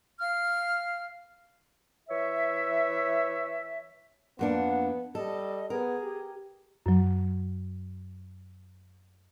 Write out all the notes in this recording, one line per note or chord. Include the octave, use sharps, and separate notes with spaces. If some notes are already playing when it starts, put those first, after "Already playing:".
F5 F6
E3 C#5 E5
F2 A#3 B3 D4 F#5
G3 A4 D#5
B3 G#4 A#4
G4
F#2 F#3